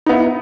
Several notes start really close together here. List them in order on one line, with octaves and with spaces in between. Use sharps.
D#4 B3 E4